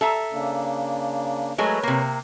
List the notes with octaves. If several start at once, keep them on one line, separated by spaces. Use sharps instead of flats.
A4 E5 A#5
C#3 A#3 D4
F#3 G#3 A3 A#4 B4 C#5
C3 A#3